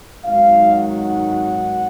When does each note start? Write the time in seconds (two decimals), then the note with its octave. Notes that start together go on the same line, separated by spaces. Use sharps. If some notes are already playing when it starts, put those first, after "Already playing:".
0.24 G#1 G#2 D#3 F#3 F5
0.71 F#5